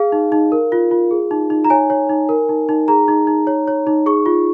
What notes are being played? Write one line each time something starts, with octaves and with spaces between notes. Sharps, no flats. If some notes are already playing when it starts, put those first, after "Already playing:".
Already playing: G#4 F5
D#4
D#4
A#4
F4
F4
G#4
D#4
D#4
A#5
C#5 G#5
C#5
D#4
A#4
D#4
D#4
G#4 A#5
D#4
D#4
C#5
C#5
D#4
G#4 C#6
F4